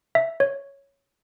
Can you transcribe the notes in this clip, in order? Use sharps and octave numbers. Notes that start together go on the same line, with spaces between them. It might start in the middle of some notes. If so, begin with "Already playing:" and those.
E5
C#5